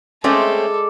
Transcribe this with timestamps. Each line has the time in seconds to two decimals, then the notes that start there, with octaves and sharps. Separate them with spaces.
0.24 G#3 A3 C4 C#4 A4 D5